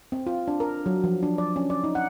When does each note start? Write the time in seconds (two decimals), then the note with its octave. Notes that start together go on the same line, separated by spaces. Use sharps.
0.12 C4
0.26 F4
0.48 D4
0.60 A#4
0.86 F#3
1.04 F3
1.23 D4
1.38 D5
1.56 C#4
1.70 D5
1.84 D#4
1.95 F#5